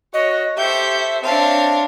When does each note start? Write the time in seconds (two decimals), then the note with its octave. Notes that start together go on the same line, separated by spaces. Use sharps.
0.14 F#4 C#5 D#5
0.57 G4 A4 C5 E5 C#6 G6
1.23 C4 D4 C#5 F5 A5